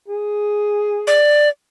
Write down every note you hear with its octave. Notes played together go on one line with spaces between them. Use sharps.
G#4
D5